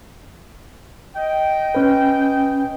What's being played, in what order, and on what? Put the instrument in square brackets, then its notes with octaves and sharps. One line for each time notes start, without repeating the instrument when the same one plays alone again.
[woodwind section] D#5 G5
[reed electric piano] C#4 B4